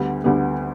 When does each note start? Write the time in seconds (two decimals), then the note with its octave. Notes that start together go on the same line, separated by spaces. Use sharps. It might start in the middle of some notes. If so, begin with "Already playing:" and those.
Already playing: D2 D3 G3 B3
0.24 D2 D3 G3 B3